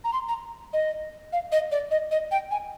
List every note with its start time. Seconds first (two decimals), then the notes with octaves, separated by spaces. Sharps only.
0.04 A#5
0.13 C6
0.29 A#5
0.73 D#5
1.33 F5
1.52 D#5
1.72 D5
1.91 D#5
2.11 D#5
2.31 G5
2.51 G#5